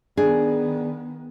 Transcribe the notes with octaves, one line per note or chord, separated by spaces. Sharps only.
D#3 B3 D4 G#4